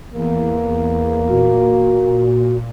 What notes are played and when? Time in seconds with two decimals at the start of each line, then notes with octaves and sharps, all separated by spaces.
0.13 E2 A#3
1.29 A#2 F#4